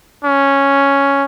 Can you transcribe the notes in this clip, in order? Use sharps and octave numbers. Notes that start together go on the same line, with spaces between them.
C#4